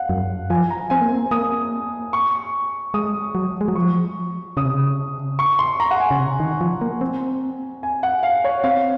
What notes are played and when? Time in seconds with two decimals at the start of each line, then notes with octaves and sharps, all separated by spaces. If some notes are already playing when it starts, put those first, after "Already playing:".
Already playing: F5 F#5
0.09 F#2
0.50 F3 G#5
0.70 A#5
0.90 C4 G#5
1.01 A#3
1.12 C4
1.31 A#3 D#6
2.13 C#6
2.94 G#3 D#6
3.35 F#3
3.61 G#3
3.68 F#3
3.75 F3 C#6
4.57 C#3 D#6
4.65 C3
4.74 C#3
5.39 C#6
5.59 C6
5.80 A#5
5.91 F#5
6.00 G#5
6.11 C#3
6.20 C3
6.40 D#3
6.61 F3
6.81 A#3
7.01 C4
7.83 G#5
8.03 F#5
8.23 F5
8.44 C#5
8.64 C4 F5